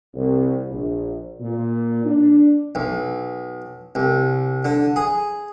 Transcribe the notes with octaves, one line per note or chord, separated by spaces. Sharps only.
C2
A#1
A#2
D4
B1
C2
D3
G#4